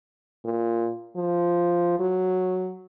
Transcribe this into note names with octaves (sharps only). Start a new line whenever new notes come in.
A#2
F3
F#3